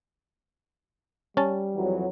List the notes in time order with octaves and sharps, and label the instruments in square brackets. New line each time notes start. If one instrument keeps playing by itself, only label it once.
[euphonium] G3 [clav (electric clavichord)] C#4 A5
[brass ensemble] F2 E3 F#3